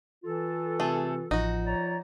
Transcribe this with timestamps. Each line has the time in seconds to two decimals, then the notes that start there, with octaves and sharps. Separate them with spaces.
0.24 E3 F4 A4
0.80 C3 A3 G#4
1.31 A1 F3 D#4 F#4
1.66 C#5 D5 A#5